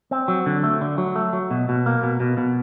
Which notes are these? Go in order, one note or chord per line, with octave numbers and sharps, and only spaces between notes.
C4
F#3
D3
A3
D3
F#3
A3
F#3
B2
B2
A#3
B2
B2
B2